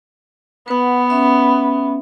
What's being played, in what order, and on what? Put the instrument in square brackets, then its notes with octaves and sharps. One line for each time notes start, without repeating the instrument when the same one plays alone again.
[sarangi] B3 [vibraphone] B4 F#5
[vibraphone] C#4 E5